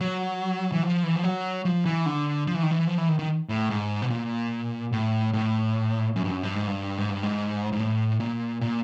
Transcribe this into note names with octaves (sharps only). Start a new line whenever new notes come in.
F#3
E3
F3
E3
F3
F#3
F3
E3
D3
F3
E3
D#3
E3
F3
E3
D#3
D#3
A2
G#2
B2
A#2
A2
A2
F#2
G2
F#2
G2
G#2
G2
G#2
G2
G#2
G#2
A2
A#2
A#2